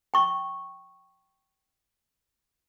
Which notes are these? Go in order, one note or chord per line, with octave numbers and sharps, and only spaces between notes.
G5 C#6